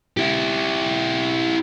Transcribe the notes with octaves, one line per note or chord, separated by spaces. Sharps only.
E4 G4